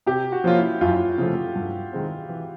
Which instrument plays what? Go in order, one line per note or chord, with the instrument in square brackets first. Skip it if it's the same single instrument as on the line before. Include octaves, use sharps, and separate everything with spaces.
[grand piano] C3 [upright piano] G4
[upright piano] F#4
[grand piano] F3 A#3 C#4 F4
[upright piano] E4
[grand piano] F#2 [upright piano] F4
[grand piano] C#3 F3 A3
G2
D#3 G#3 C4
E3